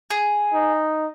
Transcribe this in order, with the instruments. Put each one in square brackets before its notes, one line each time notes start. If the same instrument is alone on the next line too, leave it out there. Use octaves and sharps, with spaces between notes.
[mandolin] G#4
[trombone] D#4